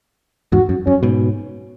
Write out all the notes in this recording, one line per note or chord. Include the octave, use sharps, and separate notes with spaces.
E2 G#2 F#4
F#2
F#2 C#4
G#2 B2